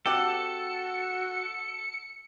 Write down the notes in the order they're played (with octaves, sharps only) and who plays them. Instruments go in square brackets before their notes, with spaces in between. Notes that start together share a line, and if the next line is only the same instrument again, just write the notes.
[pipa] C4 G4 F#5 [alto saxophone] F#4 [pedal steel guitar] A4 [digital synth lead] C#7